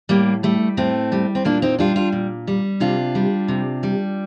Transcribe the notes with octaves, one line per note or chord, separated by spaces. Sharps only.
A2 G3 A#3
G3 A3
A2 A3 C4
G3
C4
A#2 A#3 D4
C4 D#4
G3 D4 F4
D4 F4
A#2
G3
C3 D4 F4
G3
C3
G3